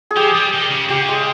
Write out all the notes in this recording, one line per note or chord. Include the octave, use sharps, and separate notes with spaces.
G#4
F3 G4
G3
D#3
C#3
C#3 G4
G#3